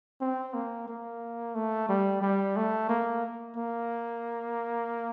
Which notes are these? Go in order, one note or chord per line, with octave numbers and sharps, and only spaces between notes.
C4
A#3
A#3
A3
G3
G3
A3
A#3
A#3